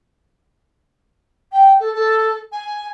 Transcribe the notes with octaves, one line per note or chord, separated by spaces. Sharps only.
G5
A4
A4
G#5